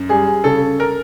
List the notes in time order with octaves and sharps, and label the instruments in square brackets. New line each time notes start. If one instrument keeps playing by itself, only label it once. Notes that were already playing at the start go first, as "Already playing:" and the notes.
Already playing: [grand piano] F#2
G3 G#4
C#3 A4
A#4